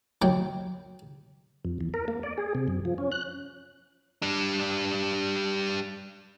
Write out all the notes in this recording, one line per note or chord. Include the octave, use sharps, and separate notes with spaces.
D#2 F#3 G5
F2
E2
A#4
A#3
D5
G#4
C3
F#2
F3
C#4
F#6
G3 D4